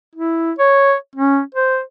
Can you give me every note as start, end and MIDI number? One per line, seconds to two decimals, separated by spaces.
0.15 0.52 64
0.59 0.94 73
1.15 1.41 61
1.55 1.81 72